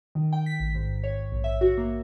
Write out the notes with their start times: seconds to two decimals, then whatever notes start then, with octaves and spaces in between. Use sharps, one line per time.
0.15 D#3
0.33 G5
0.46 B6
0.60 A1
0.75 G#2
1.04 C#5
1.32 A#1
1.44 E5
1.61 F#4
1.78 A#3